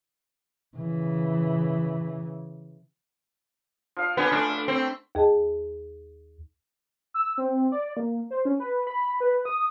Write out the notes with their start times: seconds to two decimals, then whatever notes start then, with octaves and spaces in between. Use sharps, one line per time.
0.77 C#3 E3
3.96 F3 F5
4.17 D3 B3 G#5 D6
4.32 A3 D4
4.50 E5
4.68 C4
5.15 D#2 G#4 D#5 A5
7.14 E6
7.38 C4
7.72 D5
7.97 A#3
8.31 C5
8.45 C#4
8.60 B4
8.87 B5
9.20 B4
9.45 D#6